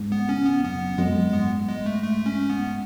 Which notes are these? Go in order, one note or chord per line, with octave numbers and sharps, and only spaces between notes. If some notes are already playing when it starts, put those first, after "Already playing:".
Already playing: G#2
B3
C#3 C#4
B3
F#2 B3
F#2 G#3
G#2 B3
G#3
A3
A3
C#4
B3